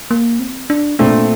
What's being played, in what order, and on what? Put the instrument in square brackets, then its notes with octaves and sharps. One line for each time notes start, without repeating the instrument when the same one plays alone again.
[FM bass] A#3
C4
D4
[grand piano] A#2 A3 C4 [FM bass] D4